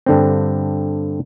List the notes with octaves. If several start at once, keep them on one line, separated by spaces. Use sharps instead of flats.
G2 D3 C4